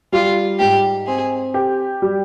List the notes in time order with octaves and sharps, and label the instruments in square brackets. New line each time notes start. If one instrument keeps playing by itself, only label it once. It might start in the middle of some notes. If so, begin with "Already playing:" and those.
[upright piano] G3 [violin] F4
[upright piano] G#2 [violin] G4
[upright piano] C4 [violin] G#4
[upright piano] G4
G3